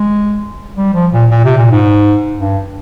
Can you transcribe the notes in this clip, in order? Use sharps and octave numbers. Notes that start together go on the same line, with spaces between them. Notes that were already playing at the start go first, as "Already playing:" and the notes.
Already playing: G#3
G3
F3
A#2
A#2
C3
A#2
G#2
G2